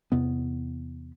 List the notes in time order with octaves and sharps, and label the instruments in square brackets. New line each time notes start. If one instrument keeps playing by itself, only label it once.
[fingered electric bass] E2 C3 B3